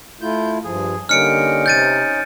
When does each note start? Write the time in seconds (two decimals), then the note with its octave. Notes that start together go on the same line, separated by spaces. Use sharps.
0.21 A3 E4 F4 G6
0.64 G2 F3 G#4
1.09 D3 G3 A#3 C#4 D#4 F6 C#7 D7
1.66 C3 G6 A6 D#7